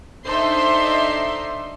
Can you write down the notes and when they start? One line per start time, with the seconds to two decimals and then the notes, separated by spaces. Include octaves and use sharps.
0.24 D4 D#4 A4 C5 E5 C6